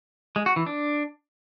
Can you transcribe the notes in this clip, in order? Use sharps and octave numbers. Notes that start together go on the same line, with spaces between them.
G#3
F#4
E3
D4